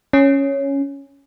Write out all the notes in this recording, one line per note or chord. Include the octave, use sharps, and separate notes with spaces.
C#4